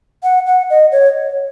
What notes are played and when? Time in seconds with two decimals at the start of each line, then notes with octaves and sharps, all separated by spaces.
0.23 F#5
0.46 F#5
0.70 D#5
0.92 C#5